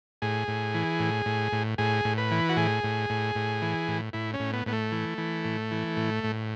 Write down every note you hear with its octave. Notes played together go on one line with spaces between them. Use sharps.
A2 G#4
A2
E3
A2
A2
A2
A2 G#4
A2
B4
E3
F#4
A2 G#4
A2
A2
A2
E3
A2
A2 E4
C#4
A2
B3
A2 B3
A3
E3
E3
A2
E3
A2
A2